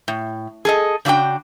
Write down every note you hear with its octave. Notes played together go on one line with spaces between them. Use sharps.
A2
G#4 A4 D#5
C#3 D4 F#4 D#5 G5